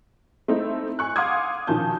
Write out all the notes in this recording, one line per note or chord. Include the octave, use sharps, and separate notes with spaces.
A3 C4 D#4 E4
G#5 C#6 F#6
F5 F#5 C6 D6 D#6 G#6
B1 D#3 F3 C#4 A5 G6